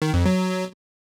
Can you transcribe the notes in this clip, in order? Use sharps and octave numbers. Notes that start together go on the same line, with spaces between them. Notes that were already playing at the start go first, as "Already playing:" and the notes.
D#3
F2
F#3